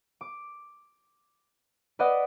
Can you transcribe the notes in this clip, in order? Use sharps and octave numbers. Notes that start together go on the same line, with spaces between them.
D6
B4 D5 D#5 F#5